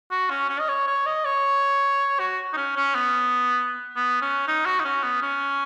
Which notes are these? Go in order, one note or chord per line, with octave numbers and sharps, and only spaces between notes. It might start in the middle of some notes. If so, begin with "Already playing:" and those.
F#4
C#4
C#4
D#5
C#5
C#5
D#5
C#5
F#4
D#4
C#4
C#4
B3
B3
C#4
D#4
F#4
D#4
C#4
B3
C#4